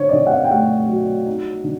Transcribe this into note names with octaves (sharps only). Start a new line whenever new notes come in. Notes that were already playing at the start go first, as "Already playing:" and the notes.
Already playing: D3 C5 C#5
D5
D3 D#5
F#5
F5
G5
A3 F#5
F#3
D#4
D3